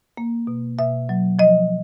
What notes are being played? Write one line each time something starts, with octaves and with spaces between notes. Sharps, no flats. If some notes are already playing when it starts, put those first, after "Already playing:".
A#3
B2
B2 E5
F#3
F3 D#5